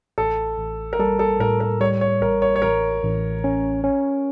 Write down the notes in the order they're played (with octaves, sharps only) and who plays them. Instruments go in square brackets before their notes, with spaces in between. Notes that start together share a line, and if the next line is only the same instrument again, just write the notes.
[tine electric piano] A1 [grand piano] A4
[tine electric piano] A1
[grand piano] A#4
[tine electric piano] G3 [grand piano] A4
[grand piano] A4
[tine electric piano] A2 [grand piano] A#4
[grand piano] A#4
[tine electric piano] G3 [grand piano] C#5
[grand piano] C#5
[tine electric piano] A1 [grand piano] A#4
[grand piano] C#5
C#5
[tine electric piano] A1 [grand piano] A#4
[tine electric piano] A1
C#4
C#4